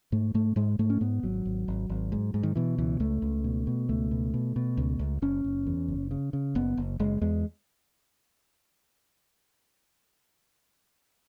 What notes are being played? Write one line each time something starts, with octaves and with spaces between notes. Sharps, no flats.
G#2 A3
G#2 A3
G#2 G#3
G#2 A3
C#4
G#2 B3
G#1 F#3
G#1
G#1
G#1
G#2
G#2
D#3
B2 E3
C#2 E3
C#2 A3
C#2
B2
B2
C#2 A3
B2
B2
B2
C#2
C#2
F#1 C#4
F#1
E2
F#1
C#3
C#3
F#1 B3
F#1
F#1 G#3
E2 G#3